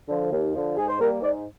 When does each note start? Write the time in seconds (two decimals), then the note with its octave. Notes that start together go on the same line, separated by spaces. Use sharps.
0.09 D3 F3
0.32 D#2
0.54 D3 F3
0.77 G#2 G#4
0.88 C5
0.99 G3 A#3 A#4
1.22 G#2 D5